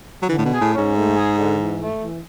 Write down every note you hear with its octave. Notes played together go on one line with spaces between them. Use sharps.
F#3
D3 E3
A2
B2
G#4
A2
G#2 C#4
A3
G#4
D3
E3
A3
E3